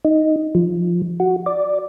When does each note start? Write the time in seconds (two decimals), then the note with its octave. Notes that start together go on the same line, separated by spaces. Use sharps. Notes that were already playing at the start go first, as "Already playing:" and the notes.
0.05 D#4
0.55 F3
1.20 F#4
1.46 D5